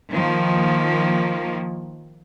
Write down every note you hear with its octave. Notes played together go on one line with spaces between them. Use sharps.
D#3 F3 A#3